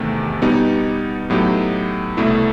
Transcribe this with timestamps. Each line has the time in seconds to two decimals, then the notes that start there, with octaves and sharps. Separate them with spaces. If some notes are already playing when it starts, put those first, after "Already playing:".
Already playing: E2 C3 D#3 A3
0.42 B2 G3 B3 D#4 G4
1.30 A2 F#3 B3 D#4 G4
2.17 C2 B2 A3 E4